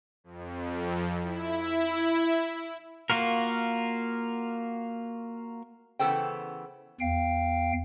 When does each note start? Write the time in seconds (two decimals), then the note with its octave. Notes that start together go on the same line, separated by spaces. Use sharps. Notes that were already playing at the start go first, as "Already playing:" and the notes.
0.24 F2
1.22 E4
3.10 A#3 F4 F#4 A#4
5.99 C#3 E3 B3 A4 C5 G5
7.00 E2 F5 G5